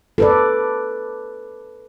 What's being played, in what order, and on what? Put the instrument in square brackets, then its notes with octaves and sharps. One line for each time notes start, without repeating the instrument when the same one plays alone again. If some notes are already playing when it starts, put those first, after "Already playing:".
[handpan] A4 B4 D5